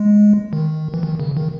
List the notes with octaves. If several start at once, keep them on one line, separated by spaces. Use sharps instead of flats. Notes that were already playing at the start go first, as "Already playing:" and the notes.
Already playing: G#3
D#3
E3
D#3
C#3
D#3